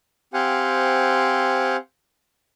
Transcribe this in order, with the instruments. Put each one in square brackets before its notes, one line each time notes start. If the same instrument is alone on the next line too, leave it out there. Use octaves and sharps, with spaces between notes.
[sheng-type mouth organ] C4 G4 C5 F5 F#5 G#5